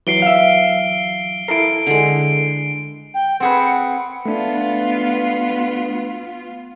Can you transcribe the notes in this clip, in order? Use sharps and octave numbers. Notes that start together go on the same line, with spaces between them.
E3 F#3 C7 D7 G7
E5 F5
E4 A4 A#4 C7 D7
D3 G#3
G5
C4 G#4 B4 F#5
A3 B3 D4 F4